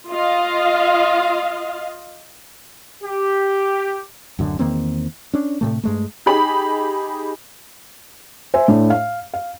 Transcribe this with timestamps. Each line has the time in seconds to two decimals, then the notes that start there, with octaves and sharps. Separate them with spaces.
0.10 F4 D#5 F5
3.03 G4
4.39 D1 F#2 D3
4.59 E2 D#3 A#3 C4
5.34 C#4 D4
5.61 A2 C3 A3
5.84 G2 G#3 A3
6.26 D#4 G4 G#4 B5
8.54 C5 E5 G#5
8.68 A2 D4
8.90 F5
9.34 F5